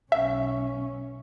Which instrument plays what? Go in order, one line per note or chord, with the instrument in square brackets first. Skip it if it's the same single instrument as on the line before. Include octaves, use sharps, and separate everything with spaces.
[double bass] B1 C#4 [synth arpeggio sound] E5